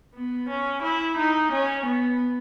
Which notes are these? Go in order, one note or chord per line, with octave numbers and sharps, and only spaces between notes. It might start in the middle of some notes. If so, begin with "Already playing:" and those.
B3
C#4
E4
D#4
C#4
B3